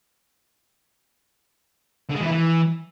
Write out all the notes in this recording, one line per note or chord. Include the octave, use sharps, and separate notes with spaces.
D3
G#3
E3
E4
E3